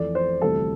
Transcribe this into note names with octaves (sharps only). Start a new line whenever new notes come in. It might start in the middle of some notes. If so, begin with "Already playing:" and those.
Already playing: F2 E3 A3 D5
C5
D2 C3 E3 G3 A4